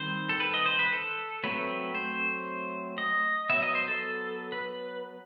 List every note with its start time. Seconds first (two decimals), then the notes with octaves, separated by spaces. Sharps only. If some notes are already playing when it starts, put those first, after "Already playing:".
Already playing: D#3 G3 C4 C5
0.29 A4
0.40 B4
0.54 D#5
0.66 C5
0.79 B4
0.92 A4
1.43 F#3 A3 C4 B4
1.95 C5
2.98 D#5
3.49 F#3 B3 E5
3.62 D#5
3.75 C5
3.88 A4
4.52 B4